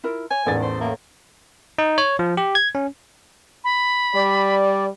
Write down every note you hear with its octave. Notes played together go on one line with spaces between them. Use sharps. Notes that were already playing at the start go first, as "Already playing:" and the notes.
E4 F4 A#4
C#5 G#5
A1 E2 G#2 D3 D#3 A4 A6
C5
A2 A#3
D#4
C#5
F3
G4
G#6
C#4
B5
G3 D5